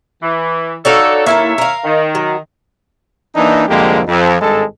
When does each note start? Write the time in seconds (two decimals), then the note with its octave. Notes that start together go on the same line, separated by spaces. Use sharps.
0.22 E3
0.85 D#4 F#4 A4 C#5 D5 F5
1.26 D#2 A#3 E4 A4 C#5 E5
1.58 A#4 F5
1.84 D#3
2.15 F#3
3.35 E3 A#3 D4 D#4
3.68 C2 F2 D3 G#3 A#3 G4
4.07 F2
4.41 G#1 G2 G#3 A4